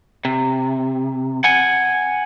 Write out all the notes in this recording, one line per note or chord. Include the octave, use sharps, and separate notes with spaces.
C3
F#5 G#5